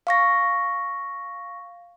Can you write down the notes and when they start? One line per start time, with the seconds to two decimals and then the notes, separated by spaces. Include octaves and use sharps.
0.07 F5 C#6 A#6